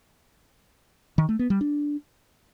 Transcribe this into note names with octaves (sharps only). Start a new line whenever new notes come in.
D#3
A3
B3
G3
D4